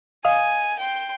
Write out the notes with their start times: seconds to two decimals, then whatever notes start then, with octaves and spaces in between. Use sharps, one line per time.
0.25 D#5 F5 G#5 D#6
0.79 G5 C6